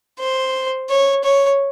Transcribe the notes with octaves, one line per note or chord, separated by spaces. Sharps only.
C5
C#5
C#5